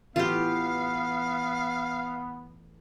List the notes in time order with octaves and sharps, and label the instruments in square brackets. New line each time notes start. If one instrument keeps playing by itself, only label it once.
[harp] A2 E3 A3 [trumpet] B3 [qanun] F4 G4 [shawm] F5